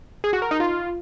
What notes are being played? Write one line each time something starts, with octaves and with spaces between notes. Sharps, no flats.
G#4
F#4
A#4
D#4
F4